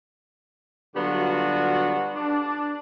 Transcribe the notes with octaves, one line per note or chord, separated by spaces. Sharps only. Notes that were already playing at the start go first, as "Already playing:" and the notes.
D3 F#3 G3 B3 F4 F#4
D4